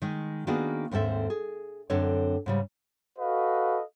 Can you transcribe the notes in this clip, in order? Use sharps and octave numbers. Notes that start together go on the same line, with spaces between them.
D#3 G#3
D#3 A#3 B3 D4 F#4 G#4
D#2 G#2 C4 A4 E5
G#4
F#2 D3 C4 D4 A4 C#5
G#2 C#3 G3
F#4 A4 B4 D#5 F5